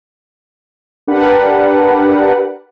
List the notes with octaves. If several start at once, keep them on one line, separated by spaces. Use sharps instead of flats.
D4 G4 A#4 B4 F#5